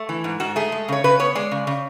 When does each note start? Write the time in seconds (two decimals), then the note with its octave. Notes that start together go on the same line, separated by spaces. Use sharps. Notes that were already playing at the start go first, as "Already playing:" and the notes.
Already playing: A3
0.09 E3
0.24 G#2
0.40 G#2 F#4
0.56 A3 G#4
0.72 G#3
0.88 C#3 C#5
1.04 C#3 B4
1.19 B3 C#5
1.35 G#3 D5
1.51 C#3
1.67 C#3